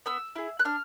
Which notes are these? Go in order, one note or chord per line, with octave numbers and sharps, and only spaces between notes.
B3 E6
E4 G#4
F#6
D4 F6